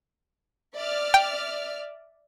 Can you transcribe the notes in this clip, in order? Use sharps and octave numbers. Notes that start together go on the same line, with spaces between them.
D5 E5 F6
G5